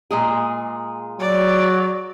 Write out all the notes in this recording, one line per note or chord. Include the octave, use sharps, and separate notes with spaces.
A#2 G#3 G#4
F#3 D5